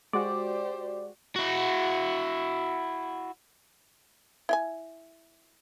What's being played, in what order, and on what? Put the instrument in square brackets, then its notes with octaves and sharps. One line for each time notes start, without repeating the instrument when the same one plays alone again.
[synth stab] G#3 F#4 [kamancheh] G4 C5 [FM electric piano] D5
[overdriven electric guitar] E4 F#4
[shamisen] E4 G5 G#5